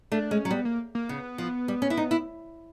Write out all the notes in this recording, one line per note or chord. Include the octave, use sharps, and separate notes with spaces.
A3 D4
G#3 C#4
F#3
G3 B3
A#3
A#3
C#3 B3
F3
G3
C#4
E4
D#4
E4